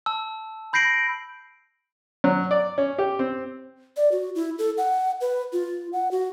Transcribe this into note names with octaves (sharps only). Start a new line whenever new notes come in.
A5 E6
B5 G6 A#6 C7 D7 F#7
F#3
D5
C#4
G4
C4
D5
F#4
E4
A4
F#5
B4
F4
F#5
F#4